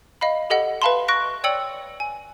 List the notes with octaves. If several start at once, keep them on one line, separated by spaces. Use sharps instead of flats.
D#5 F5 B5
G4 A4 D#5 F#5
B4 E5 F5 A5 B5 C6
C#6 F#6 A#6 D7
C#5 D5 G5 E6 C#7 F#7
G#5